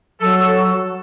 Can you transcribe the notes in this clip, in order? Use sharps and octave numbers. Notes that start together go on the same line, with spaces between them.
F#3 A4